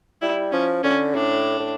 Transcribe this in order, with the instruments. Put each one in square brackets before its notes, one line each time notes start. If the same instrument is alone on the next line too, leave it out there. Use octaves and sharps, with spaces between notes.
[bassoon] G3 [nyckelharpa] E4
[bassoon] F3 [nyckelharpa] C#4
[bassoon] D3 [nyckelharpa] C#4
[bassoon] A2 [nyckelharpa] D4
[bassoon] A2